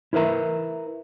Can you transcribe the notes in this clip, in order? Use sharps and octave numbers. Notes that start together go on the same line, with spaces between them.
E4 A#4 B4 E5 A#5